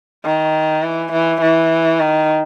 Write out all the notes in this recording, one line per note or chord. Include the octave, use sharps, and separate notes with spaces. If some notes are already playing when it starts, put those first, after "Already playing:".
D#3
E3
E3
E3
D#3